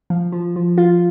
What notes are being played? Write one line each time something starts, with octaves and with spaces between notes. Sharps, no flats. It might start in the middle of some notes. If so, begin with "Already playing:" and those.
F3
F3
F3
F4